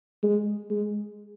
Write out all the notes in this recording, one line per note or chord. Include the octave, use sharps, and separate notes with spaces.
G#3
G#3